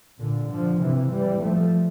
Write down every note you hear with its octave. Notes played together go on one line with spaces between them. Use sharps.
A#2 D3
D3 F3
C3 E3
E3 G3
F3 A3